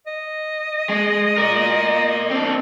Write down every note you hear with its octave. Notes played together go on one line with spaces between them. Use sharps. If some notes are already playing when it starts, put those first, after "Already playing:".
D#5
G#3
A#4 D5
C4 D4